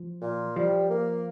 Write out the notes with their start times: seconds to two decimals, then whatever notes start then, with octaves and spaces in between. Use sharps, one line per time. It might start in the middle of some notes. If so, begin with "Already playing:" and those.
Already playing: F3
0.22 A#2
0.56 F3 G3
0.90 A#3